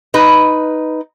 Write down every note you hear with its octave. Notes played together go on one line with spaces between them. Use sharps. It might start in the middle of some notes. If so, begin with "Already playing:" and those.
D#4 B4